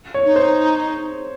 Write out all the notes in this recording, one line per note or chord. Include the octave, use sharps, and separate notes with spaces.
C#5
D#4
C5